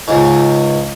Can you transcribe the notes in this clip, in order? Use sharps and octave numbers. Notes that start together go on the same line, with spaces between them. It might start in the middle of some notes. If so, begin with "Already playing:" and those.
C#2 G#2